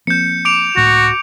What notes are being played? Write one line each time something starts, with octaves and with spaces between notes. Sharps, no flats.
F3 A#3 C4 G6 C#7
D6 D7 F7
C#2 A2 F#4